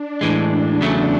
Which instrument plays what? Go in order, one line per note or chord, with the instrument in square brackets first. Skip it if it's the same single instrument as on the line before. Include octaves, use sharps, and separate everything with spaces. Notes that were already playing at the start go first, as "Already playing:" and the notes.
Already playing: [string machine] D4
[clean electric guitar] A2 E3 G#3
[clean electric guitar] E2 C#3 F#3 A3 [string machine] D4